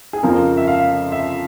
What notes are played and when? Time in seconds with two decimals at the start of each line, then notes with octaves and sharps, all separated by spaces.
0.13 G#4
0.23 F2 C#3 F3 A#4
0.57 E5
0.67 F5
1.12 E5